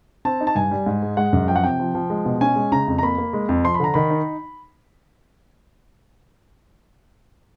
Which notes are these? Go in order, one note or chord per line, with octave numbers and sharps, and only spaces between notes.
C4 A5
D#4
A5
G2 G#5
G3
G#2
G#3
G#3 F#5
F#2
F3 G5
F#5
C3 G5
F3
F3
G#3
B2
C#4 G#5
G#3
C#3 A#5
F2
A#5
A#3 B5
A#3
G#3
F2
F3 C6
B5
D3 A#5
D#3 B5
D#4